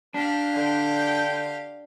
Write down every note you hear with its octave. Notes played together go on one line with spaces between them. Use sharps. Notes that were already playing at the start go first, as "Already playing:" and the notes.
D4 G4 A#4 F5
D3 G5